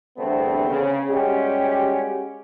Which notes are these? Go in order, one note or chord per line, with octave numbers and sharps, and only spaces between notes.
E2 G2 D3 A3 B3 C4
C#3
G3 G#3 C#4 F#4 G4